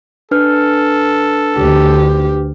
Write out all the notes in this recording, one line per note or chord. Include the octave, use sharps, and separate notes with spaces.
D4 A4 B4 F6
D2 G4